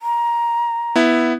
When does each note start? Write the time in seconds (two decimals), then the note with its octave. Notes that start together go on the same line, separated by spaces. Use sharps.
0.02 A#5
0.96 B3 E4